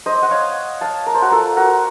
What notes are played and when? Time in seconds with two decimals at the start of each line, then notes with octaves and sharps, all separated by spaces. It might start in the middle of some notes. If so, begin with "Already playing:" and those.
0.06 C5 D#5
0.23 F#5
0.31 C#5 F5
0.81 F5 A5
1.06 A#4
1.14 C5
1.22 F#4 A#4
1.32 F4 A4
1.57 F#4 A#4